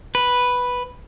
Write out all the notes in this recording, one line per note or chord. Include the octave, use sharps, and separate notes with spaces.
B4